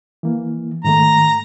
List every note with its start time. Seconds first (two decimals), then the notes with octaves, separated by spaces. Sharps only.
0.23 E3 A#3
0.84 G#2 D#3 A3 A#5